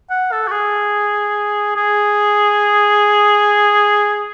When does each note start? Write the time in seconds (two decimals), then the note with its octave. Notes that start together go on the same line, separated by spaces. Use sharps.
0.10 F#5
0.32 A4
0.48 F#4
0.51 G#4
1.76 G#4